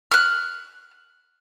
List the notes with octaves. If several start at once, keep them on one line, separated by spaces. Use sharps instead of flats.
F6 F#6